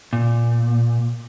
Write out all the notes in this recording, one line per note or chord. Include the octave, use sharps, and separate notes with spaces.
A#2